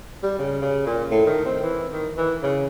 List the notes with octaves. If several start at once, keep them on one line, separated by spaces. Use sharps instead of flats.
G3
C#3
C#3
A#2
A2
D#3
C4
E3
D#3
E3
C#3